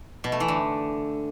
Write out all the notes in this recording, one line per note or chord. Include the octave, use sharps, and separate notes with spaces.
B2
A3
E3
D3